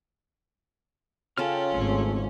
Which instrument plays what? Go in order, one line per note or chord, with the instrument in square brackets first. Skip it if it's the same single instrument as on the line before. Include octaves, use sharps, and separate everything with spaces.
[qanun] C#3 F4 A4 [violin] C#4 [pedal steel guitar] G5 A5 F6
[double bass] G#1 [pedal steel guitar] A3 C4